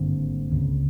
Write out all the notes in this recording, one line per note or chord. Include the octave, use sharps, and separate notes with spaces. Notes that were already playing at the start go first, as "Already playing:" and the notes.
Already playing: G#1 G2 D3 A#3 C4
C#2 C#3